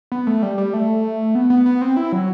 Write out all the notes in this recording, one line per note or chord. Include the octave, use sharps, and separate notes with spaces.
B3
A3
G3
G3
A3
B3
B3
B3
C4
E4
F#3